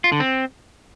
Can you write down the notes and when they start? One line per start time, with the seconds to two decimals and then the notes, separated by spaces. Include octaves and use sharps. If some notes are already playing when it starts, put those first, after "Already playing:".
0.04 F4
0.12 D3
0.20 C4